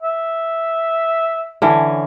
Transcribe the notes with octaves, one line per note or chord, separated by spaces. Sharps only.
E5
D3 E3 C#4